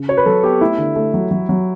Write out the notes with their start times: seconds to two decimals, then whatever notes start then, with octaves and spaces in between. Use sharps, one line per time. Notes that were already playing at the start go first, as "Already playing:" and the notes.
Already playing: C#3
0.08 F#4 C#5
0.17 B4
0.26 F#3 A4
0.43 B3 G4
0.60 A3 E4
0.78 D3
0.96 A3
1.14 F#3
1.31 F#3
1.49 F#3